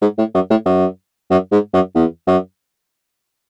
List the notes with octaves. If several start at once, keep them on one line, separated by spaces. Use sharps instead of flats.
G#2
A2
F#2
A2
F#2
F#2
G#2
F#2
E2
F#2